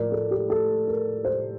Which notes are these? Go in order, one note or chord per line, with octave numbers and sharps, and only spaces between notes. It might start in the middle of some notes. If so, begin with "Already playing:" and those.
Already playing: A2 F3 A#4 D5
A4
G4
A4
A#4
C5